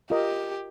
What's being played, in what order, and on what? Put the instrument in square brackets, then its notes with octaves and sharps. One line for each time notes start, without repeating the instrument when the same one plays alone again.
[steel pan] F4 A#4 D#5 [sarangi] G4